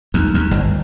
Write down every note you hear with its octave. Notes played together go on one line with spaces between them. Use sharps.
D#2
D#2
G1